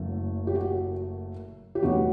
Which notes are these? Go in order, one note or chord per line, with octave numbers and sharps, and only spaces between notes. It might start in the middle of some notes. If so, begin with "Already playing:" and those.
Already playing: F#1 F#2 F#3 A3
G4
F#4
G4
E2 D#3 F#3 A3 F#4